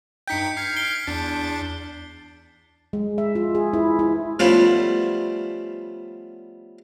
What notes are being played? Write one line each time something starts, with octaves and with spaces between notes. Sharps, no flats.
G2 D#4 G5 G6 B6 C#7
F6 G#6 C7
C7 D7 G7
E2 D4 A6
G#3
E5
F4
G#4
E4
E4
F3 G3 A3 B3 C#4 F4